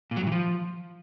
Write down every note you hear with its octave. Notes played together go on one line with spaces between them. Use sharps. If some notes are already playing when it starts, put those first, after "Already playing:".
A#2
F#3
G2
E3
F3